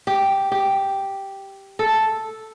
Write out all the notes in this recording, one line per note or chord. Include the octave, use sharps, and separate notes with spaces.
G4
G4
A4